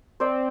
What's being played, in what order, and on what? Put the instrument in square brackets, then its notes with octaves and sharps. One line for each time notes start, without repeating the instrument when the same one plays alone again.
[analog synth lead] C4 [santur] C5 D5